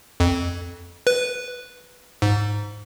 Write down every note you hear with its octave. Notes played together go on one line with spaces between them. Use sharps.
F2
B4
G#2